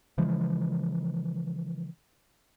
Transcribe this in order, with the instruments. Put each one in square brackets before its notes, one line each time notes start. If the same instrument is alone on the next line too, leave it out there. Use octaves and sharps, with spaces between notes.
[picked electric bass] C#3 E3 F3 G#3